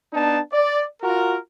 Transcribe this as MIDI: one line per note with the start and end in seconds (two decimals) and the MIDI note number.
0.13 0.39 59
0.13 0.39 62
0.13 0.39 63
0.13 0.39 81
0.52 0.83 74
1.02 1.37 65
1.02 1.37 66
1.02 1.37 70